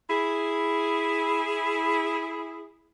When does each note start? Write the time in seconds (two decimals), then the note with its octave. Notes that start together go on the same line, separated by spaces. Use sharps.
0.09 E4 G#4